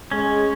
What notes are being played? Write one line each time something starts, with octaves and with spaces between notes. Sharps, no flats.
G#3 C#4